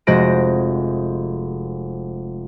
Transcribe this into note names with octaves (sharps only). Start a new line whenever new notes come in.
F1 G#3 F#4 C5 A#6 D7